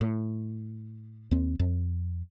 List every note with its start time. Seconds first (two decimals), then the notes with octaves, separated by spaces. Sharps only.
0.01 A2
1.31 D#2 C4
1.59 F2